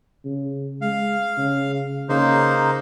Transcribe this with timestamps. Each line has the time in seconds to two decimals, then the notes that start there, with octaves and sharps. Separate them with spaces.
0.25 C#3
0.81 G#3 F5
1.38 C#3
2.09 C#3 A#3 D#4 C5